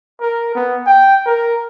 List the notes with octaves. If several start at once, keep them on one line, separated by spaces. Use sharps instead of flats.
A#4
B3
G5
A#4